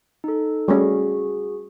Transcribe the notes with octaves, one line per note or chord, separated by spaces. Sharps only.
D#4 A4
G3 A3 C#4 F#4 G#4